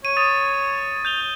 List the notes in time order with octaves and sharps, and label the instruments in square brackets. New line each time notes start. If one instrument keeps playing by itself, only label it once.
[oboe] C#5 [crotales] D#7
[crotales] D#6 A6 D#7
G6 F7 G7